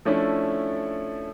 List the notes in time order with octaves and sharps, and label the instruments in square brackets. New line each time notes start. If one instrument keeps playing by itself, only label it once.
[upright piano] F3 A3 C#4 D4 E4